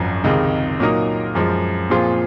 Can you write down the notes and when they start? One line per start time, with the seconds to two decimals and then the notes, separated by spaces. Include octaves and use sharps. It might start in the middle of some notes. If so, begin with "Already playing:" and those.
Already playing: G#1 F#2 F3
0.24 C#2 C3 D#3 G#3
0.80 A#2 F#3 A#3 D#4 A#4
1.35 F#2 F3 G#3
1.90 A#2 F3 C4 F4 G#4